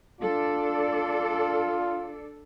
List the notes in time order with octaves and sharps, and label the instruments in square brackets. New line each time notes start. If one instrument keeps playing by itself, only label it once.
[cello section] D4 A4 D5 [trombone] F4